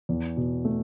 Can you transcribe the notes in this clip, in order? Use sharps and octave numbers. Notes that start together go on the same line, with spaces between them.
E2
B2
A3